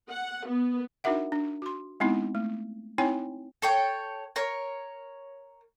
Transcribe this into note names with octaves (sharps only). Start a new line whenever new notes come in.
F#5
B3
D4 D#4 F#4 A#4 E5 F#5
D4
F#4 C6
G#3 B3 C4 D#4 E4
A3
C4 D#4 E4 C#5 G5 G#5
A4 C#5 G5
A#4 C#5